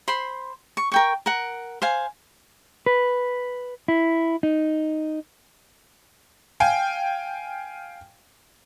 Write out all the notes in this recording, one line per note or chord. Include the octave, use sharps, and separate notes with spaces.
C5 B5 C6
C#6
A#4 G5 C#6
A#4 F#5
C5 F5 G#5
B4
E4
D#4
F5 G5 G#5